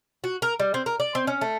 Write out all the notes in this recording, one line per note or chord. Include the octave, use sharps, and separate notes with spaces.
F#4
A#4
G3
C4
A#4
D5
C4
C#4
A3